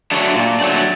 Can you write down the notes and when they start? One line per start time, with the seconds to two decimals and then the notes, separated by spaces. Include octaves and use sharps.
0.11 F#3 A3 D4
0.35 A#2
0.60 F#3 A3 D4